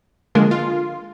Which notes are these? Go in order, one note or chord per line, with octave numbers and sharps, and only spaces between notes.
D3 F3 G#3 A#3
F4